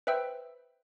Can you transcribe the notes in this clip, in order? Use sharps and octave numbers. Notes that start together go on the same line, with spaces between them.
B4 C5 E5 G5 E6